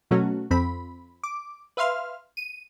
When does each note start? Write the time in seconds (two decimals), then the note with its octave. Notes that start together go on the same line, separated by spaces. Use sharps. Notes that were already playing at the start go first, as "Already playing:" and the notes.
0.11 B2 F#3 A3 C#4 F#4
0.51 F2 C4 B5
1.24 D6
1.77 B4 E5 F5 C6 F6
2.37 D#7